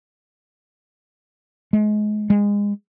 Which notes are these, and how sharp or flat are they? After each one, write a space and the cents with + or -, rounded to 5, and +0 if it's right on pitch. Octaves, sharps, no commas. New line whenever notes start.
G#3 +30
G#3 -25